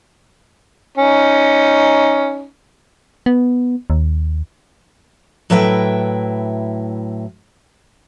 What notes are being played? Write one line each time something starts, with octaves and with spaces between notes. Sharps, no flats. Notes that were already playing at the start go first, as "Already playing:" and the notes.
C#4 D#4
B3
D#2
A2 F#3 E4 B4 E5 G5